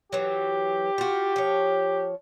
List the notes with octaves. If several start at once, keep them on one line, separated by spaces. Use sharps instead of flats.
E3 F#3 G4
F4 F#4
F3 C#5